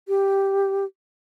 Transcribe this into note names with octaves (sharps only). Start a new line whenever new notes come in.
G4